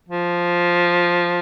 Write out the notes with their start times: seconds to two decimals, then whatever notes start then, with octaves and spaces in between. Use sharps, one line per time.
0.09 F3